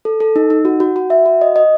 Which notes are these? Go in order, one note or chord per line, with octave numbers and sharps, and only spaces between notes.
A4
A4
D#4
D#4
F#4
F#4
F#4
E5
F#4
D#5
D#5